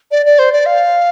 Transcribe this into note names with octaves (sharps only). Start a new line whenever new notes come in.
D5
D5
C5
D5
F5